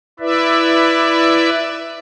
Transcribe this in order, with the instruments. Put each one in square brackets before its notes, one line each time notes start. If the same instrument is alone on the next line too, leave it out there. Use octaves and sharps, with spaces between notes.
[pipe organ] E4 B4 D5 E5